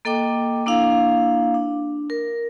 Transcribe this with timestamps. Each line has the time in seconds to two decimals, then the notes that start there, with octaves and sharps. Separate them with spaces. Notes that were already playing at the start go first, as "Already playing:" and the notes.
0.05 A#3 A4 D#5 G5 D6
0.66 A#3 D4 E4 F5
1.54 D4
2.10 A#4